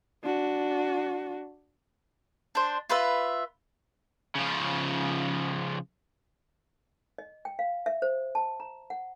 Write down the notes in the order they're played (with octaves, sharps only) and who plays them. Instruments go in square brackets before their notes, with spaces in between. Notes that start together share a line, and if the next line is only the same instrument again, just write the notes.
[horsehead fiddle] D4 F#4
[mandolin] D4 C5
F4 B4 E5
[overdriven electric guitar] C#3 F3
[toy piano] D#5
G5
F5
E5
C5
A5
A#5
F#5